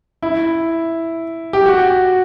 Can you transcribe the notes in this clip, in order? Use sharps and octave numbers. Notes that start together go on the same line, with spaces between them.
E4
G4
F#4